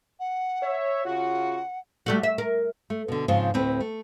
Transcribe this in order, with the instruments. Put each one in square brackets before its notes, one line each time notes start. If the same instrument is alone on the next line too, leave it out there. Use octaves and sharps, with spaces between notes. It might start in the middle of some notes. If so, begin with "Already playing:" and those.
[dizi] F#5
[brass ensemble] C#5 E5
[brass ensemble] C#3 F4 F#4 [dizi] F#5
[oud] G3 A3 F#4
E5
A#4
[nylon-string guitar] A3
B2 D3
G#2 C#3 F3 C4 F4
D2 A2 C4 B4
A3